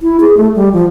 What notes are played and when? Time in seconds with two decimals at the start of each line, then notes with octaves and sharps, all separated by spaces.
0.01 E4
0.20 G#4
0.37 A3
0.55 G3
0.73 F3